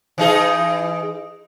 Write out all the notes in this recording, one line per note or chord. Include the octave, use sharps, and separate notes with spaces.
E3 D#4 G#4